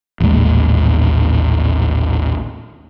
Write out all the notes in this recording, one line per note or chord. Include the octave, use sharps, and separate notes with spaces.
A1 D#2 A#2 G#3